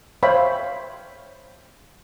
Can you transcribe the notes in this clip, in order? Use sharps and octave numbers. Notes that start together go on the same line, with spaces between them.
C5 C#5 E5 F5 G5 B5